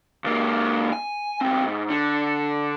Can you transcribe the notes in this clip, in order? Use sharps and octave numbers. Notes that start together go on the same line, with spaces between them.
C#2 A#3
G#5
B1 C4
G#2
D3